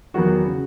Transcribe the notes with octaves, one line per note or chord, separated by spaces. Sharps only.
E2 D#3 F#3 B3 F#4
C#3